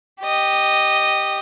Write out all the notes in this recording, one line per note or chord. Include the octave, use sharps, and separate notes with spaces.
G4 D#5